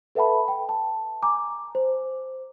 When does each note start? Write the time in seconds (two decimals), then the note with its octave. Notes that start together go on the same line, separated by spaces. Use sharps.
0.15 A4 B4 E5 F#5 A5 B5
0.48 G5
0.69 A5
1.22 G#5 A#5 D6
1.75 C5